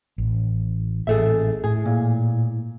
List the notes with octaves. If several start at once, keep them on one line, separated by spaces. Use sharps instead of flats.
A1
A1 A#2 G#4 A4 E5
A2 G#4
A#2